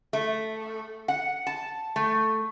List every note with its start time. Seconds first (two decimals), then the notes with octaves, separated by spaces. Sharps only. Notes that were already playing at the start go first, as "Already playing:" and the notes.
0.13 A3
1.08 F#5
1.47 A5
1.96 A3